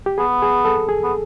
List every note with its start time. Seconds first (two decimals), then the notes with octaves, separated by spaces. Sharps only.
0.06 G4
0.18 B3 G#4
0.42 G#4
0.65 A4
0.88 G#4
1.04 B3